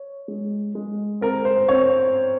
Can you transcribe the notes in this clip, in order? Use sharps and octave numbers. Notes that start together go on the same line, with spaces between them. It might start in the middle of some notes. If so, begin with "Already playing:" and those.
Already playing: C#5
G#3
G#3
C4 A#4
C5
C4 C#5